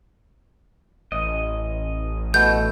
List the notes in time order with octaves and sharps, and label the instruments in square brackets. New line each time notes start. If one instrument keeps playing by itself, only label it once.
[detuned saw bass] A1 [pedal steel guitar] D#5
[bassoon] B2 [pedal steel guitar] A3 [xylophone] G6